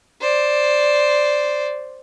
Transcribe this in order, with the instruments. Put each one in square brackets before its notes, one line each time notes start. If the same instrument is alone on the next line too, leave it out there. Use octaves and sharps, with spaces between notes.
[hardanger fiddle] C5 D5